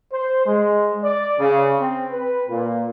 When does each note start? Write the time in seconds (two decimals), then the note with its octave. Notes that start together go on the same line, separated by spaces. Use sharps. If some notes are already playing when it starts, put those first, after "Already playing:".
0.13 C5
0.46 G#3
1.03 D5
1.39 C#3
1.80 C4
2.11 B4
2.49 A#2